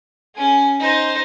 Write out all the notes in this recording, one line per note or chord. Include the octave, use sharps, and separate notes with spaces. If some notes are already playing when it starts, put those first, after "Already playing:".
C#4 G#4
D#4 C5